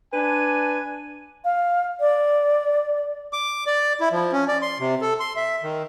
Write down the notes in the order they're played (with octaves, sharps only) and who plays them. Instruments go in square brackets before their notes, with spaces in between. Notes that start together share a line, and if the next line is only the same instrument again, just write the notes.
[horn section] D4 B4 G#5
[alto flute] F5
D5
[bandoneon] D6
D5
E4
F3
C#4
D5
C6
C3
A4
C6
E5
D#3